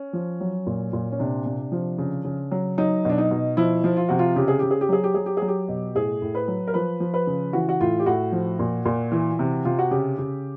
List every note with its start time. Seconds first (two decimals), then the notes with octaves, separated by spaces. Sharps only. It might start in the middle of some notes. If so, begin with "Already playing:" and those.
Already playing: C#4
0.13 F3
0.41 F#3
0.66 A#2
0.93 A#2
1.12 C#4
1.19 C3 D4
1.46 C3
1.72 F3
1.98 C#3
2.24 C#3
2.51 F#3
2.78 F#3 D#4
3.05 B2 D4
3.18 D#4
3.31 B2
3.57 F3 E4
3.84 F3
3.97 F4
4.09 C3 F#4
4.19 F4
4.36 C#3 G4
4.48 G#4
4.59 C#3 G4
4.71 G#4
4.81 G4
4.89 F#3 G#4
5.04 G4
5.14 F#3 G#4
5.26 G4
5.37 F#3 G#4
5.48 G4
5.68 B2
5.95 A2 G#4
6.22 A2
6.35 B4
6.48 F#3
6.67 A#4
6.74 F3 B4
7.00 F3
7.14 B4
7.27 C#3
7.53 E3 F#4
7.69 F#4
7.80 A2 F4
7.99 G4
8.06 A2 F#4
8.32 F3
8.59 A#2
8.85 A#2
9.12 E3
9.39 C3
9.65 C3 F4
9.78 F#4
9.91 C#3 G4
10.18 C#3